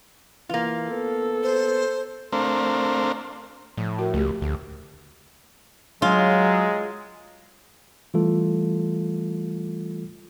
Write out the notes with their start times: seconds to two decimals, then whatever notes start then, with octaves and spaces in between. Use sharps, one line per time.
0.49 E3 A#3 F4
0.91 B3 A4
1.43 C5
2.32 A3 C4 D4 A#4 C5 F5
3.77 A2 F3
3.99 F#4 A#4
4.14 C#2 A3 G4
4.42 D2
6.02 F#3 G#3 F4
8.14 E3 G3 A3 F4 A4